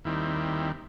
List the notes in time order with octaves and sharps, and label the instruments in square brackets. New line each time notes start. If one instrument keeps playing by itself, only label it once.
[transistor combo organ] D#2 D#3 G3 C4 E4